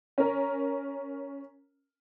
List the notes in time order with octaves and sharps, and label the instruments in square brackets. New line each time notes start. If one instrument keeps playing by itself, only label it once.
[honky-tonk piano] C#4 A#4